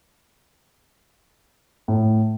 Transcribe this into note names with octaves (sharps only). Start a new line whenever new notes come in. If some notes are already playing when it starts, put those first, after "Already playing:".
A2